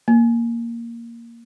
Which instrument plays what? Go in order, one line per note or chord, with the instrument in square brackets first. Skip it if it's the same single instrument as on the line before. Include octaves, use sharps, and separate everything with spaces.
[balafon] A#3